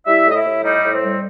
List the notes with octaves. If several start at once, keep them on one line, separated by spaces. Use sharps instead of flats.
G3 E4 E5
A2
D#5
E4 E5
A2
G3 D#4 D#5
A2
C4 C5
G3